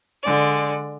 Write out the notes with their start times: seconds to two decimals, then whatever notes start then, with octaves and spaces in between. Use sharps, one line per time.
0.22 D3 G#3 D5